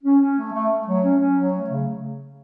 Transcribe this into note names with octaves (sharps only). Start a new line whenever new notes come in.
C#4
C#4
A3
A3
A3
F#3
C#4
C#4
F#3
A3
C#3